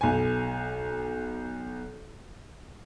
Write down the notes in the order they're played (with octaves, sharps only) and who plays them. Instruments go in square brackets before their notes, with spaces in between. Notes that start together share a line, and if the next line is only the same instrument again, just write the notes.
[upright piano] B1 G#5